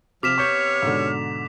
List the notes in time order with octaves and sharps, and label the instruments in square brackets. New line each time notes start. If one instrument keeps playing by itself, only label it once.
[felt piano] C3 [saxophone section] F3 [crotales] D6 B6 E7 [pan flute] F6
[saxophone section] C3 B3 C#5 [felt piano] C#6 G6
[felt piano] G#2 B2 D3